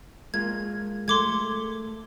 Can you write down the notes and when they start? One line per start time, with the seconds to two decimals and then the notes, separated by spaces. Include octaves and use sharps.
0.34 G#3 A#3 F4 G#6
1.08 A3 C6 D6 G#6